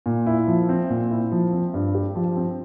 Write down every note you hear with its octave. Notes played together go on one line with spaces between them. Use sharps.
A#2
E4
F3
C4
A#2
E4
F3
C4
G2
G4
F3
C4